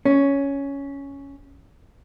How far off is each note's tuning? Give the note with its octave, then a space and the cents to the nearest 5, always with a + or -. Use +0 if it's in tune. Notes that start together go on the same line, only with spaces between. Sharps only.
C#4 +5